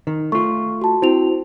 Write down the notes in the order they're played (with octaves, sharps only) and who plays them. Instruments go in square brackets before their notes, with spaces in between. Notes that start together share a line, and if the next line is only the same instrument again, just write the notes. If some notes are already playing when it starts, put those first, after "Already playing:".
[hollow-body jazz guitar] D#3
[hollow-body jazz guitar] A3 F4 [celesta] C#6
[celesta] F#4 A5
[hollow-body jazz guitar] C4 [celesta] E4 F#4 F7